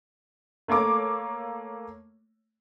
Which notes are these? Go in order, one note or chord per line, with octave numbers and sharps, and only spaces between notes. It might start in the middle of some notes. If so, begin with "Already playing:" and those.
A3 A#3 C#5 D6